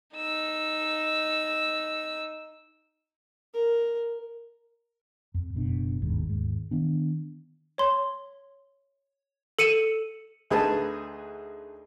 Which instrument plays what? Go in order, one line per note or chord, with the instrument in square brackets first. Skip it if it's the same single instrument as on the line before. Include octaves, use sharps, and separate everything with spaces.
[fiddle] D#4 E6
[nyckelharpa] A#4
[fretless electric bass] F2
F#1 B2 D4
G1 D#2 G#2 B2
D#2 G#2
D#3 B3 D4
[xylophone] C#5 C6
A4 C#7 D#7 E7 F#7
[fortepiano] D2 D#4 G#4 B4 G#5 A5